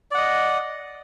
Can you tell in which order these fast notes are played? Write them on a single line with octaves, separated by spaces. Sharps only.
D5 F#5 D#5